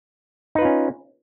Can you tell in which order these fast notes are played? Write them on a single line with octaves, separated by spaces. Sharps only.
D#4 B4 F4 C#4